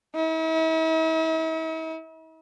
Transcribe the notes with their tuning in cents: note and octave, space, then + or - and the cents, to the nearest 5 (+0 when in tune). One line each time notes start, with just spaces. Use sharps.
E4 -45